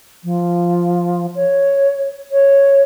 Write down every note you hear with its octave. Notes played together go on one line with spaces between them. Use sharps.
F3
C#5
C#5